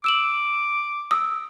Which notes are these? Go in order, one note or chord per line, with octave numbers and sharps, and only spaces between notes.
D6 E6 E7 F#7
D#6 E6